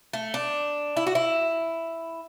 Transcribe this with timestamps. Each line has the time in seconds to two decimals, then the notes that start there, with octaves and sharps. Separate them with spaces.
0.13 A3
0.34 D4
0.97 E4
1.07 F#4
1.15 E4